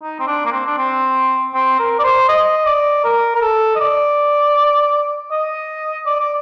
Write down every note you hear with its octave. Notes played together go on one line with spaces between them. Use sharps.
D#4
C4
D4
A#3
C4
D4
C4
C4
A#4
D5
C5
D#5
D5
A#4
A#4
A4
D#5
D5
D#5
D5
D5